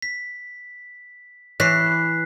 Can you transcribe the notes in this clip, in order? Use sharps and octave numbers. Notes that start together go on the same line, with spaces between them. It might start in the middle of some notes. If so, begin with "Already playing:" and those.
B6
E3 C#5 F#6 B6 C7